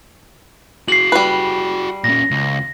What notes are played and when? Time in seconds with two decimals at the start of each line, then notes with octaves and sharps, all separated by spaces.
0.88 F#4 G#4 C7 F#7
1.12 G3 B4
2.04 A#2 C#4 A#6
2.31 C#2